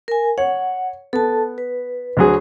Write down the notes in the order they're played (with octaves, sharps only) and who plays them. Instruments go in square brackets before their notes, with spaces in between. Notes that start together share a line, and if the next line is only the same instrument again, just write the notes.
[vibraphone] A#4 G#5
[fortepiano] C#5 [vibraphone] F#5
[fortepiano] B3 [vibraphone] A4 A5
[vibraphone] B4
[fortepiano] D2 F#3 G#4